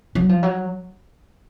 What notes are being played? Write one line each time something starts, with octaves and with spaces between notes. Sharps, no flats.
F#3
F3
F#3